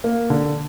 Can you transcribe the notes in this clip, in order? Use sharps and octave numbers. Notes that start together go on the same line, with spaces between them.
A#3
D3